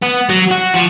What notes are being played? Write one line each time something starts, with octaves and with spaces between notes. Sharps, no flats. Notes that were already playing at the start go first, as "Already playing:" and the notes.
B3
F#3
F#4
F3